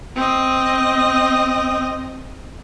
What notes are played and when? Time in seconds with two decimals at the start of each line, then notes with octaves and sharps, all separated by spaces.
0.16 C4 D#5